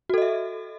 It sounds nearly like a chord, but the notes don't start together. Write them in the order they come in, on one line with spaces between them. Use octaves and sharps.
F#4 A4 D#5 E5